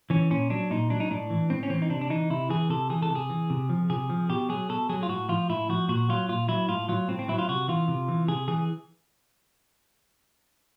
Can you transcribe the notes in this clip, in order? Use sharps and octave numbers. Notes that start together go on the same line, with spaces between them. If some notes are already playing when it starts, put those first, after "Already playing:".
E3 C#4
A#2 C#4
F#3 D4
A#2 D#4
F#3 D4
D#4
A2 D4
E3
A2 C4
C#4
E3 C4
D#4
C3 D4
D4
E3 D#4
C3 E4
E3 G#4
C3 A4
E3 G#4
A4
C3
G#4
E3
C3
F3
C3 G#4
F3
B2 G4
F#3 G#4
B2 A4
F#3 G#4
F4
A2 F#4
F3 F4
A2 E4
F3 F#4
A#2 F#4
F#3 F4
A#2 F4
F#3 E4
A2 F4
F#3 F4
A2 C4
C4
F#3 E4
F4
C3 F#4
E3 F4
C3
E3
C3 G#4
E3 G#4